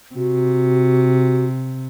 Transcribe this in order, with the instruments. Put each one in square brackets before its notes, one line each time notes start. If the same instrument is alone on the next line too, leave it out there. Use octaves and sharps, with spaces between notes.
[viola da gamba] C3 [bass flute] F#4